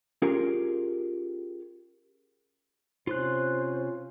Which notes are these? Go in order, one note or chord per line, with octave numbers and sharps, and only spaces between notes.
C#4 F4 G4 G#4 A#4
C3 C#4 F4 C5 C6 F#6